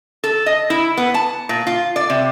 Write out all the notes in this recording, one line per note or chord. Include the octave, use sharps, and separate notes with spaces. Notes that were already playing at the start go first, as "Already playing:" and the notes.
A4
D#5
E4
B3
A5
A#2
F4
D5
C3